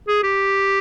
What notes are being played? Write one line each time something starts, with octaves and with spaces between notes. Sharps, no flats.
G#4
G4